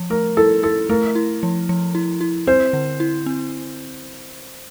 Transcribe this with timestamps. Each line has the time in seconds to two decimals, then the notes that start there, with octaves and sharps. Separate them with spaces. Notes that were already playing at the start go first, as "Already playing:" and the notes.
Already playing: F3
0.10 A3 A#4
0.37 E4 A4
0.63 E4 A4
0.89 A3 A#4
1.15 E4
1.43 F3
1.69 F3
1.95 E4
2.21 E4
2.47 C4 C5
2.73 D3
3.00 E4
3.26 C4